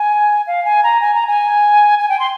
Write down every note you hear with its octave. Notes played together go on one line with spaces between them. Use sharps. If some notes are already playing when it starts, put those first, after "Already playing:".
Already playing: G#5
F5
G#5
A#5
G#5
A#5
G#5
G#5
G5
C6